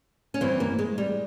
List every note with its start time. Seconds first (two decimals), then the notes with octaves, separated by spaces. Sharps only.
0.34 C#4
0.41 G2 E3 C4
0.60 A#3
0.79 G#3
0.98 G3